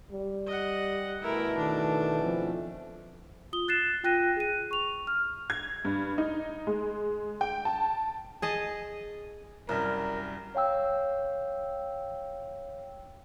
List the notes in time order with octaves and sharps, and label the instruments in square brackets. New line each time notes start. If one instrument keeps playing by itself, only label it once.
[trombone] G3
[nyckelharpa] D#5 F#5
[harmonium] B2 E3 A3 [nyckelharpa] E4 A#4
[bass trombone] D#3 [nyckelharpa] D4 [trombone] A4
[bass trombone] F3 [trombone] C4
[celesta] F4 D#6 G7
F#6 A6 C7 E7
F4 G5 F#6 A#6 D#7
G#4 D#7
C#6 F7
F6
[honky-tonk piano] G#6
G2
D#4
G#3
G5
A5
[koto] G#4 D#5 A5
[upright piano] C2 F#2 G3 [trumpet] A#4
[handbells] C#5 F5 G5 E6